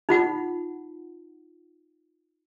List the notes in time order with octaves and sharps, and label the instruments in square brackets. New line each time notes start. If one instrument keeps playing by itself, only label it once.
[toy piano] D#4 F4 F#5